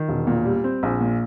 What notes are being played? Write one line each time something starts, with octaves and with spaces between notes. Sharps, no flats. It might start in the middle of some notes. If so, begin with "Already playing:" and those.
Already playing: D#3
E1
A#2
G3
C4
A#1
A#2